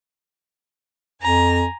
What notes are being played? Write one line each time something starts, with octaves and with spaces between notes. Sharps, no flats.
F2 G#5 A#5